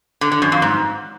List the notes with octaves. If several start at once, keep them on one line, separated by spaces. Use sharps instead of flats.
D3
D3
F#2
F2
G#2